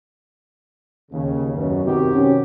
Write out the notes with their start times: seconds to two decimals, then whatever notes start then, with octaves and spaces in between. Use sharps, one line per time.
1.11 D#2 C#3
1.54 F#2 B2
1.84 C3 D#3 F#4 G4
2.14 C#4